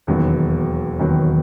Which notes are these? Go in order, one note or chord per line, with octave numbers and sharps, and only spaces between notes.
E1 D#2 D#3 F#3 B3
E1 D#2 D#3 F#3 B3